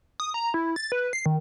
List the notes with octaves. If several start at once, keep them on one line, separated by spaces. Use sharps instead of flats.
D#6
A#5
E4
A6
B4
C7
D#3